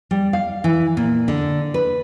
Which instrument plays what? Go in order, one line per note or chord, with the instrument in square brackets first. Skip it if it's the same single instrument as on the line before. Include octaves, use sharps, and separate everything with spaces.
[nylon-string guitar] G3
F5
E3
A#2
D3
B4